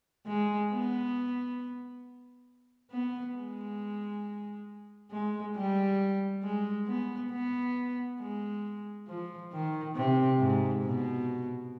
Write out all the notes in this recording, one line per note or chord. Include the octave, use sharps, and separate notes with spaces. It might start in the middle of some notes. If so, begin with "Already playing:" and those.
G#3
B3
B3
G#3
G#3
G3
G#3
B3
B3
G#3
F3
D#3
C3
G#2
B2